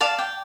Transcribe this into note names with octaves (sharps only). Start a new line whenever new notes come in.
D5 F5 A5
D5 G5